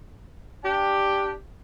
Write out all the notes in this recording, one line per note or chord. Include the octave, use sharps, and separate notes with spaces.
D4 G4